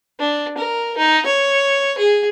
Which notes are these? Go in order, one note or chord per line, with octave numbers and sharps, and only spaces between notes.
D4
A#4
D#4
C#5
G#4